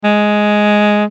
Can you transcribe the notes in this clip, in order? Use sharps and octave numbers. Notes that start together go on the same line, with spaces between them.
G#3